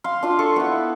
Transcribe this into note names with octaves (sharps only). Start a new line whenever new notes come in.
F5 C6
D4 F4
A4 C#6
B3 E4